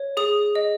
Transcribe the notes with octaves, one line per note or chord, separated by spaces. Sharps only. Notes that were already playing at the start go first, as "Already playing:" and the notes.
Already playing: C#5
G#4 D#6
D#5